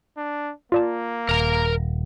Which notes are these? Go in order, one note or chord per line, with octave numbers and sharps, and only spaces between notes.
D4
A#3 F4 D5 A5
D#1 A#4 A#5